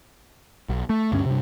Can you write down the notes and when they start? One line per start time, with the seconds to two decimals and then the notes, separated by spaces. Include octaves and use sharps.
0.69 B1
0.90 A3
1.12 D2 G2 C#4
1.26 G2 C3